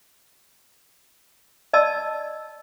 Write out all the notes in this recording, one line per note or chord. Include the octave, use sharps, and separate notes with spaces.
D5 D#5 A5 E6